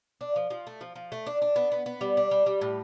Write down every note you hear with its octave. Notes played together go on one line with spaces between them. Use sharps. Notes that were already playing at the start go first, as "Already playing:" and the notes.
D4
F3
F3
A3
F3
F3
A3
D4
D4
B3
B3
B3
G3
D4
G3
G3
A2